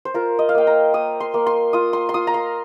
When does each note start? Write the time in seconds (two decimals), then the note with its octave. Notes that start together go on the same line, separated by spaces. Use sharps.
0.05 C5
0.14 F4 A#4
0.39 D#5
0.49 F5
0.55 A#3 G5
0.67 A#5
0.94 A#3 D#6
1.20 C6
1.34 A#3
1.47 C6
1.73 F4 D#6
1.93 C6
2.09 C6
2.14 F4 D#6
2.27 A#5
2.34 C6